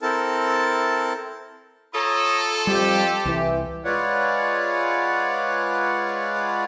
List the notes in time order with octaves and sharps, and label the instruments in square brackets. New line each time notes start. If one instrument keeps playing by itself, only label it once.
[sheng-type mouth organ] C4 E4 A4 A#4 A5
[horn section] F4 A4 [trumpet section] C#5 A#5 D#6
[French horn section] F2 F3 [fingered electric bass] G3 [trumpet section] G4
[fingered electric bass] C2 [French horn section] E3
[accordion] G#3 F4 B4 C#5 D5 F#5